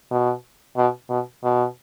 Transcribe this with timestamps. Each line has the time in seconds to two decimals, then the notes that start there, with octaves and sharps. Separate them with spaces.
0.11 B2
0.77 B2
1.09 B2
1.43 B2